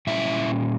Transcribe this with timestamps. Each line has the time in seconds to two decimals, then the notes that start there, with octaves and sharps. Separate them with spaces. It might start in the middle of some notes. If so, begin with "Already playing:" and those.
0.07 A#2 G3 C#4 E4 E5